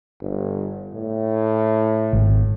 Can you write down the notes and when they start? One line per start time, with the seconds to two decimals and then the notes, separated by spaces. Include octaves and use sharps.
0.21 G1
0.94 A2
2.13 G#1